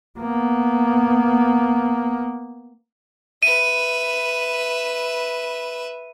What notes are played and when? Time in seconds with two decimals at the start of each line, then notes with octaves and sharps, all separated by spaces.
0.19 A#3 B3
3.43 B4 E5 D#7